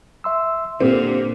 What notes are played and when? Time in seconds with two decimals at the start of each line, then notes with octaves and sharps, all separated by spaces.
0.24 E5 C6 E6
0.80 A#2 D3 C4 D4 G4